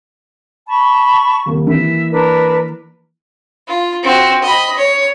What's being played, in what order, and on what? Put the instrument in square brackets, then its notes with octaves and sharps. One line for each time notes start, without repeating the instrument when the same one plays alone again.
[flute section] A5 B5 C#6
[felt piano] D#1 A#3
[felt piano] E3 A#3 [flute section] E5
[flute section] D4 A#4 B4
[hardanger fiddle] F4
C4 F#4
D#5 B5
C#5